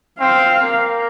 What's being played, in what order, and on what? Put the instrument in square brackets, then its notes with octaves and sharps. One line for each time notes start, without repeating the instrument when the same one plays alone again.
[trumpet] C4 [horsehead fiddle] F5
[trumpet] A#3